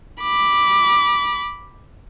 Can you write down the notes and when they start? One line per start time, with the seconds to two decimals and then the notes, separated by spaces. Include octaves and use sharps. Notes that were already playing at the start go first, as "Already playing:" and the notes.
0.22 B5 D6